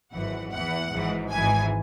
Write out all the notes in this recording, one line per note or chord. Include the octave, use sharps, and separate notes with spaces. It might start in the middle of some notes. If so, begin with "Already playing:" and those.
G#1 F#2 E3 F#5
E2 E3 F#5
G#1 G#2 E3
G#1 G#2 E3 G#5